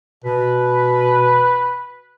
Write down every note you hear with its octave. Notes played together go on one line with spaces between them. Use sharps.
B2 B4